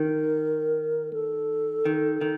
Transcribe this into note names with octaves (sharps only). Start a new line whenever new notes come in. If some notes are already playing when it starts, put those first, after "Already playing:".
Already playing: D#3 A#4
A4
D#3
D#3